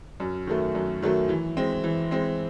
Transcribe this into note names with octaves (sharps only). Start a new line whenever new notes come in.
F#2
D#3 F#3 A3
F#2
D#3 F#3 A3
E3
G#3 C4
E3
G#3 C4